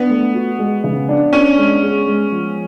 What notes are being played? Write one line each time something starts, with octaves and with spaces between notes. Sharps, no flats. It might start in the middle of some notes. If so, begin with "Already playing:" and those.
Already playing: B3 D4
A3
F#4
G#3
C#3
D4
C#4 D4
G#3
G#4
G#3
F3